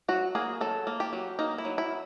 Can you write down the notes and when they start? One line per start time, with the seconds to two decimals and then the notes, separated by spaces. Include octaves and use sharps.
0.08 F#3 F#4
0.35 A#3 G#4
0.61 F#3 A4
0.87 A#3
1.00 G4
1.13 F#3
1.39 A#3 D#4
1.58 E4
1.65 F#3
1.78 E4